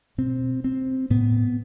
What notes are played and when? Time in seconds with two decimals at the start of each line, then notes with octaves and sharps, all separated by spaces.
0.18 B2 C4
0.64 C4
1.10 A2 B3